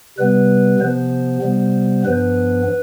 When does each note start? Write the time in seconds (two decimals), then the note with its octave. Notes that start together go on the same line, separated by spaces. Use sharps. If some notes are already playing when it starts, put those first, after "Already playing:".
0.18 C3 G3 B3 B4
0.80 C3 F3 B3 C5
1.42 C3 G3 B3
2.04 G2 F3 B3 B4